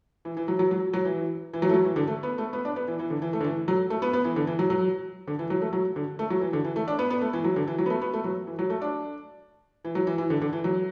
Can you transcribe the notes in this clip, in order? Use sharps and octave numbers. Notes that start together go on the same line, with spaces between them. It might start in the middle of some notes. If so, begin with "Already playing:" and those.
E3
E3
F#3
F#3
F#3
F#3
E3
E3
F#3
A3
F#3
E3
D3
A3
B3
A3
B3
D4
B3
E3
E3
D3
E3
A3
D3
E3
F#3
A3
B3
B3
E3
D3
E3
F#3
F#3
D3
E3
F#3
A3
F#3
D3
A3
F#3
E3
D3
E3
A3
D4
B3
B3
A3
E3
F#3
D3
E3
F#3
B3
A3
B3
A3
F#3
E3
F#3
A3
D4
E3
F#3
E3
E3
D3
D3
E3
F#3